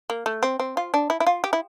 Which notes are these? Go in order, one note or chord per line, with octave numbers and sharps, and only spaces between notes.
A#3
A3
C4
C4
F4
D4
E4
E4
F4
G4
E4